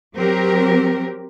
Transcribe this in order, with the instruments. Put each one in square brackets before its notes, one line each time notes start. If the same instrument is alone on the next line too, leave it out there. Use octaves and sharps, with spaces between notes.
[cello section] F#3 C4 G4 A#4